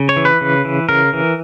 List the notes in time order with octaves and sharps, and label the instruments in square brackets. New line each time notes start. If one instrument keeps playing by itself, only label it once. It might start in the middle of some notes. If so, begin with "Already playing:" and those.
Already playing: [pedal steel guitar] C#3
C#5
E3
B4
C#3
E3
C#3 A#4
E3